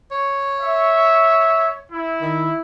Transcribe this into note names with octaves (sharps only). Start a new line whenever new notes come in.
C#5
E5
E4
D#3